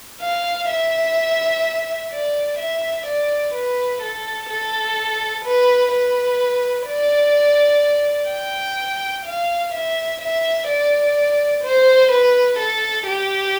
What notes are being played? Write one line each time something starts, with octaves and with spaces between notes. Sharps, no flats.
F5
E5
D5
E5
D5
B4
A4
A4
B4
B4
D5
G5
F5
E5
E5
D5
C5
B4
A4
G4